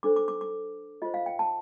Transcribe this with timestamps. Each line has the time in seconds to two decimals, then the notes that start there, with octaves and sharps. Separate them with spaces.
0.03 D4 A4 C5 D6
0.16 D6
0.28 D6
0.41 D6
1.02 F4 C5 D#5
1.14 F5
1.26 G5
1.39 A5